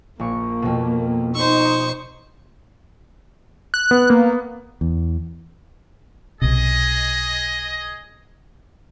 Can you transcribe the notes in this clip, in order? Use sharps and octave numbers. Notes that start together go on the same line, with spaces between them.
A#1 A#3 C#6
F2 B2
D#4 C5 C#6 E6
F#6
B3
A#3
E2
B1 C3 G#4 D#5